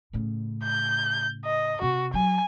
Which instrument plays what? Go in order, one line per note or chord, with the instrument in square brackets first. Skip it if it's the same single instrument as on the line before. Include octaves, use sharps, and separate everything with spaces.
[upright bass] A2 C#3
[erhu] G6
D#5
[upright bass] C3 [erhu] F#4
[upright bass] F#3 [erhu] G#5